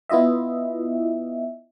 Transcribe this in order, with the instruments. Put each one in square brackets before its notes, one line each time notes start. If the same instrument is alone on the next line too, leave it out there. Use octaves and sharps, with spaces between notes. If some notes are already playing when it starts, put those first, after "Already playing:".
[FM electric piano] B3 E4 F4 D#5 E5